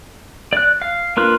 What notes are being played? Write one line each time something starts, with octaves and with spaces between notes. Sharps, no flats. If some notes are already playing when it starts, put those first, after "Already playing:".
D5 F#6
F5
A#3 D4 F4 A#4 B4